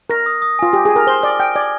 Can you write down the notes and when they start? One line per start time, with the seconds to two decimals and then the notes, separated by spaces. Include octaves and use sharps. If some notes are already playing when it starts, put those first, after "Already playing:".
0.10 A#4 A#6
0.26 D#6
0.42 D#6
0.59 F4 G#5
0.73 G4 G#5
0.85 G#4
0.90 G#5
0.96 A#4
1.07 C5 G7
1.23 D5 F6
1.39 G5 F6
1.56 D5 G#6